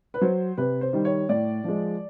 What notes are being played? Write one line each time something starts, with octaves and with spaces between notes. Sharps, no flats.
B4
F#3 C5
C3 B4
C5
D#3 G3
C#5
A2 D5
F3 G#3